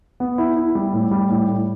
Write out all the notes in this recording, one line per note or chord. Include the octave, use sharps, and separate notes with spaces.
B3
E4
E4
G3
A2
G3
A2
A2